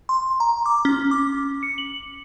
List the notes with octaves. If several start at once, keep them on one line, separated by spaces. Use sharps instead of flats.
C6
A#5
D6
C#4
D6
C#7
F#7